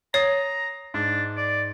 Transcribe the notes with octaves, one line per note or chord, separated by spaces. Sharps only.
C#5 A#5 D#6 A6 C7
G#2 D4
D5